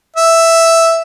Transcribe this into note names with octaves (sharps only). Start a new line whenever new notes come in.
E5